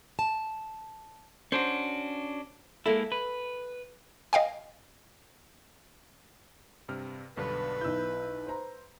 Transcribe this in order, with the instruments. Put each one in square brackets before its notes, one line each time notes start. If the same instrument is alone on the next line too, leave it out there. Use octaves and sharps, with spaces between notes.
[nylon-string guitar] A5
[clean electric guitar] C#4 D4 F#4 [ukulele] C5
[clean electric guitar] G#3 A#3 E4 [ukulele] A4 E5
[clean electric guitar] B4
[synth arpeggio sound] D#5 F5 G5 G#5
[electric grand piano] G2 C3 F6
[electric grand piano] B1 G2 D3 [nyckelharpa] B4
[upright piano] B1 E4 [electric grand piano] E6 G6
[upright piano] C5 A#5